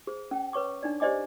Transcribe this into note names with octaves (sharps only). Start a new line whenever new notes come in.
G#4 C5
C#4 G5
B4 C#5 C#6 D6
D4 D#4 D5
G4 C5 D5 D#5 G#5 D6